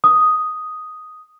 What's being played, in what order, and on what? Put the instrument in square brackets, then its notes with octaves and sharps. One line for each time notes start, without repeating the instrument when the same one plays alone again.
[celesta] D#6